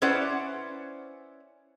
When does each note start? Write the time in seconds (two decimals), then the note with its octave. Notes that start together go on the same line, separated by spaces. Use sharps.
0.02 C#4 E4 B4 C5 D5 F#5